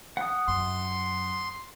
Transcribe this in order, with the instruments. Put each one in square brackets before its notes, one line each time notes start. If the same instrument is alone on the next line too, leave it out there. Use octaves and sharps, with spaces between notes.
[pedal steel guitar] F#5 D#6
[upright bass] F#2 [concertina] C6